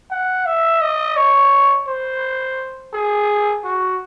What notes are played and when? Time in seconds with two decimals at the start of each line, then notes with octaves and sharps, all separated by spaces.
0.11 F#5
0.46 E5
0.81 D#5
1.16 C#5
1.87 C5
2.93 G#4
3.64 F#4